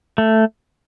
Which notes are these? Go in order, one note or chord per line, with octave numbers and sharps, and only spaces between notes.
A3